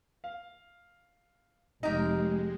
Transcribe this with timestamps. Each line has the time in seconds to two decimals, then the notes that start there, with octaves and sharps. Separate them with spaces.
0.24 F5
1.83 F1 G#3 D#4 G4 A#4